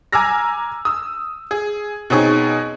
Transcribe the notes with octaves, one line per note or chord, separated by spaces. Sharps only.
G#5 A#5 D6 E6 F6 A#6
D#6 E6
G#4
B2 C4 C#4 D#4 G#4 C#6